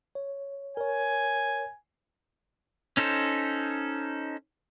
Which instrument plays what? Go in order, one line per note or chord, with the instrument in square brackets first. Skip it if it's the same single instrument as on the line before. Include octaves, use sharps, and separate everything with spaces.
[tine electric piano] C#5
[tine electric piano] A#4 C#5 [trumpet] G#5
[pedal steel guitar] C#4 D#4 A4 C5